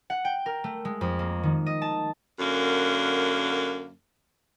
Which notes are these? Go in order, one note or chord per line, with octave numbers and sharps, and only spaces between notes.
F#5
G5
A#4
A3
G#3
F2
A#3
D#3
D#5
A5
F#2 D3 A#3